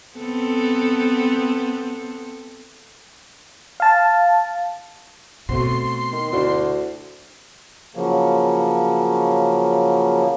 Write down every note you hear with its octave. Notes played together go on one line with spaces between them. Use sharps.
B3 C4 A4
F5 A5
B2 A3 C4 F#4 C6
D#3
D2 D4 E4 F#4
C#3 F3 F#3 A#3